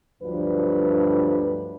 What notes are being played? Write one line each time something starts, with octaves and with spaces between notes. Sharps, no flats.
D2 G2 F3 F#3 D4 B4